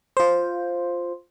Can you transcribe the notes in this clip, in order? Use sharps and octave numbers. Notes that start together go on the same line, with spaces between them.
F4 C5